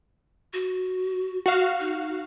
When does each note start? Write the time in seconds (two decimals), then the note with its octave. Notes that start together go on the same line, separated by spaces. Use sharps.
0.53 F#4
1.46 F#4 F5
1.80 D#4